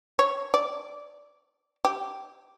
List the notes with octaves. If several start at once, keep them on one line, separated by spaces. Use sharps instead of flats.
C#5
D5
G4